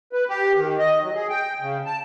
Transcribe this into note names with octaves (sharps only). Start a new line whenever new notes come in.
B4
G4
D#3
D#5
F#3
G#4
G5
C#3
A5